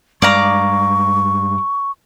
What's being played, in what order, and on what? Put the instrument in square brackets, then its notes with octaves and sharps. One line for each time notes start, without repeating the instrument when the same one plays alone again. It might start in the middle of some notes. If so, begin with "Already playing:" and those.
[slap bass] G2 G#3 [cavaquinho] D5 F5 A#5 [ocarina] C#6